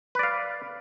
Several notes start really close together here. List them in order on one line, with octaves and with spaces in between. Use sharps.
B4 D5 F5